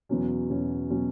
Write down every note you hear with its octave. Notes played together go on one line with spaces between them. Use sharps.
E2 B2 F#3 C#4
E2 B2 F#3 C#4
B2 F#3 C#4